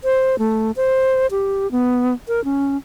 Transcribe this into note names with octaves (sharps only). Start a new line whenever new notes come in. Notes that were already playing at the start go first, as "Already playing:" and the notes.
C5
A3
C5
G4
B3
A#4
C#4